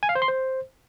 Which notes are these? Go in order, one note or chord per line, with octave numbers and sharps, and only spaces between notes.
G#5
F5
C5
C6
C5